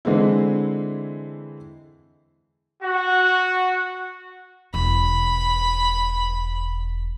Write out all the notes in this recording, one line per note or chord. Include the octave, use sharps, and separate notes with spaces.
D3 E3 G#3 C4 E4
F#4
E1 B5